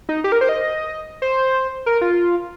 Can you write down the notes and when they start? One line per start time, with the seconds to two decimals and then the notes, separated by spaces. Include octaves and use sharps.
0.09 D#4
0.24 G4
0.32 A#4
0.41 C5
0.49 D#5
1.22 C5
1.86 A#4
2.01 F4